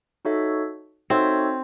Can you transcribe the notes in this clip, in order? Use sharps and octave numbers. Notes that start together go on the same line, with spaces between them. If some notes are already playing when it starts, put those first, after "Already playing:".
D#4 F#4 A4 C#5 E5
C4 D#4 F#4 A4 C#5 E5